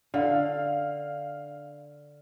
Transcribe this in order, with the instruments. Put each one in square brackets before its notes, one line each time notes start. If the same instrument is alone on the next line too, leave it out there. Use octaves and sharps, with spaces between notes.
[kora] D3 [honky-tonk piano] F5